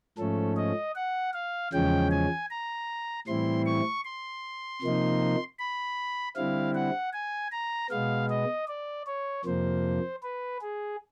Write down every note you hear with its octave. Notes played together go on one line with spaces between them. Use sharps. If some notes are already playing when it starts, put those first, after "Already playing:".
G#2 F3 A3 C#4 A4
D#5
F#5
F5
E2 C#3 F3 G#3 C#4 G5
G#5
A#5
A2 E3 G3 C4 E4 C6
C#6
C6
C3 F3 A#3 D#4
B5
D3 G3 C4 E4 F5
F#5
G#5
A#5
B2 G#3 B3 F5
D#5
D5
C#5
F2 C3 F3 A#3 C5
B4
G#4